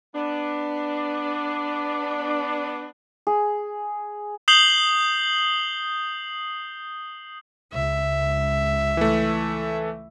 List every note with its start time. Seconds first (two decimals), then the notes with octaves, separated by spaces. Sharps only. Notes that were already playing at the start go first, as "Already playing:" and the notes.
0.14 B3 D4
3.27 G#4
4.48 D#6 G6 C7 F#7 G7
7.73 C#2 E5
8.97 E3 A3